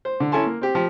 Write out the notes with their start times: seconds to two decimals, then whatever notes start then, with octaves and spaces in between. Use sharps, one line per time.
0.05 C5
0.20 D3
0.32 C#4 E4 A4 G#5 A5 C6
0.46 A#3
0.62 C4 G4
0.75 F3 G4